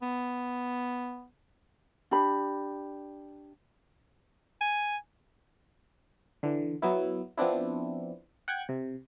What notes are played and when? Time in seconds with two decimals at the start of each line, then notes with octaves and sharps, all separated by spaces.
0.02 B3
2.11 D4 G4 B5
4.61 G#5
6.43 D3 E3
6.82 F#3 B3 E4
7.38 F3 B3 C4 D4 E4
8.48 F#5 G5 F#6 G#6
8.69 C3